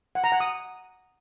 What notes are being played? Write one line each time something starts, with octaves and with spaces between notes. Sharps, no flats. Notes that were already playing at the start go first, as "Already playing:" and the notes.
F#5
A#5
F#5
D#6